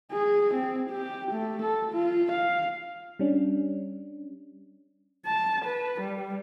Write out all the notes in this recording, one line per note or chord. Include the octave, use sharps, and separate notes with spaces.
G#4
C4
G4
A3
A4
F4
F5
G3 C#4 D4
A5
B4
G3